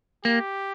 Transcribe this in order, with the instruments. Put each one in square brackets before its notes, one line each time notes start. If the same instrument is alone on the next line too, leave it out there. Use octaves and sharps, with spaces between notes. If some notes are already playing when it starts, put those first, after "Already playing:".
[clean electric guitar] A#3 [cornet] G4